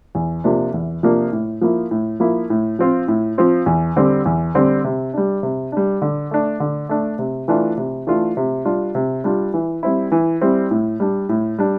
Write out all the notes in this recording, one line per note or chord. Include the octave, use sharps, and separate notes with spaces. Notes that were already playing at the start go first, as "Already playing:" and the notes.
E2
C3 F3 A#3 D4
E2
C3 F3 A#3 D4
A2
F3 A#3 E4
A2
F3 A#3 E4
A2
F3 C4 F4
A2
F3 C4 F4
E2
D3 G3 C4
E2
D3 G3 C4
C3
G3 D4
C3
G3 D4
D3
A3 D4
D3
A3 D4
C3
E3 A3 D4 F4
C3
E3 A3 D4 F4
C3
G3 D4 F4
C3
G3 D4 F4
E3
G3 C4 E4
E3
G3 C4 E4
A2
G3 D4
A2
G3 D4